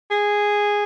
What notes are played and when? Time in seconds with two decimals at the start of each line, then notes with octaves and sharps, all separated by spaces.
0.11 G#4